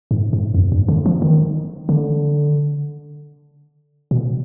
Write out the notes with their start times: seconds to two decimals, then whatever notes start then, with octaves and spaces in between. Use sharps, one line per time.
0.11 G#2
0.33 G#2
0.54 F2
0.72 G2
0.88 D3
1.06 F3
1.22 D#3
1.89 D3
4.11 B2